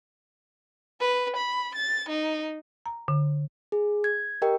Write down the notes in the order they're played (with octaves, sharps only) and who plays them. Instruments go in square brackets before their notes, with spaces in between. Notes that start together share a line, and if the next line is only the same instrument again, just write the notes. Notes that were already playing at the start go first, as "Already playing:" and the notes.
[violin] B4
B5
A6
D#4
[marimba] A#5
D3
[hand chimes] G#4
G#6
G4 A#4 D#5 G5